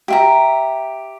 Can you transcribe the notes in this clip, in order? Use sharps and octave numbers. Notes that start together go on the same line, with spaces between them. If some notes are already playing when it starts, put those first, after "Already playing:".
G4 E5 A#5